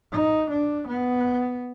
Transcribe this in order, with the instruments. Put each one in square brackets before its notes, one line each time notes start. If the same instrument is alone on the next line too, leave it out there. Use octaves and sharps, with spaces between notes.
[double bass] D#4
D4
B3